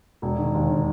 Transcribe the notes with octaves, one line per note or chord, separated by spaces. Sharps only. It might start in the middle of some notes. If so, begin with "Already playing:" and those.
E1
D#3
D#2
D#3